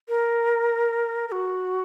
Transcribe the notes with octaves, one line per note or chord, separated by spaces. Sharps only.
A#4
A#4
F#4